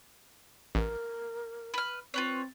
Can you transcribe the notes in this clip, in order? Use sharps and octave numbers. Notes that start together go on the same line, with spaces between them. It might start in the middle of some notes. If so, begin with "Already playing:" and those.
A1 A#4
B4 F6
C4 F4 B4 C#5